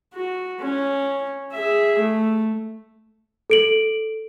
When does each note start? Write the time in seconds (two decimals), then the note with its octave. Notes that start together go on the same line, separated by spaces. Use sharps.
0.14 F#4
0.61 C#4
1.54 G#4 E5
1.99 A3
3.50 A4 D7 F#7